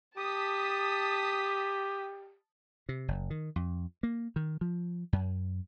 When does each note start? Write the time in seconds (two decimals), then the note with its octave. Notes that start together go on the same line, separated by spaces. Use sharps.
0.17 G4 A5 D#6 B6
2.89 C3
3.08 F#1
3.30 D#3
3.56 F2
4.03 A#3
4.36 D#3
4.61 F3
5.13 F#2